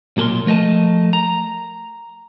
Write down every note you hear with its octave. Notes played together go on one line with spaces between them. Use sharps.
B1 A#2 A4 A#4 C6
F3 A3 A#4 D#5 A5
A#5